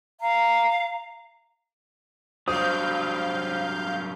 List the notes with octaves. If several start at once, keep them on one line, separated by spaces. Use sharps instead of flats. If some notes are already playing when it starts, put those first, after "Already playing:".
F5 A#5
G2 F#3 C5 F5 D#6 G6